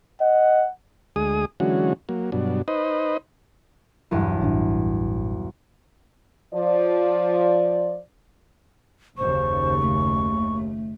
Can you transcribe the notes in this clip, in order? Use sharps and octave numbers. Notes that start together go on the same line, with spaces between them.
D#5 F#5
D2 G#3 G#4 D#6
D3 E3 F#3 G#3 C#4 F#4
F#3 A#3
G2 B2 F#3 D4
D#4 B4 C5 D#5
B1 E2 G2
A1 A2 D4
F3 D5
F#1 D#2 C#3 C5 C#6
A3